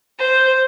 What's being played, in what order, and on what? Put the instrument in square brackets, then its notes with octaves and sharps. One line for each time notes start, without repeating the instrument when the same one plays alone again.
[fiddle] C5